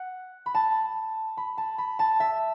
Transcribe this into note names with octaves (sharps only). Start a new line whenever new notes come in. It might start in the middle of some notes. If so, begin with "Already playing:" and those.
Already playing: F#5
B5
A5
B5
A5
B5
A5
E5